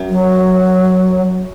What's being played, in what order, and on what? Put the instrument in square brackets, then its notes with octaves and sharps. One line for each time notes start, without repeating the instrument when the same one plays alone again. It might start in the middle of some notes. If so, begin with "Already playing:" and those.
Already playing: [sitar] F#2
[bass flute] F#3